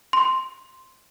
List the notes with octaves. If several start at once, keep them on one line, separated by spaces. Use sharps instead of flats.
C6